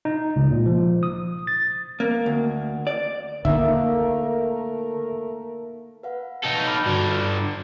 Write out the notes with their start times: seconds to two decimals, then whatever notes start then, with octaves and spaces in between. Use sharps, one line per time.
0.05 D#4
0.36 C#2
0.51 A#2
0.66 F3
1.03 D#6
1.47 A6
2.00 A#3
2.26 D2
2.87 D5
3.45 D3 A3 A#3 D#4 A#4 E5
6.03 B4 F5 F#5
6.44 D#4 A4 G5
6.67 B5 D6 F6
6.86 G2 D3 F#4